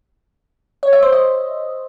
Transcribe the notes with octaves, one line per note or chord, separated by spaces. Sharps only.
C#5
E5
C5
D#5